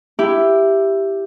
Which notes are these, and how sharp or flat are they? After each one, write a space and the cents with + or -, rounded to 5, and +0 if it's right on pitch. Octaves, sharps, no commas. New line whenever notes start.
E4 +10 G4 +0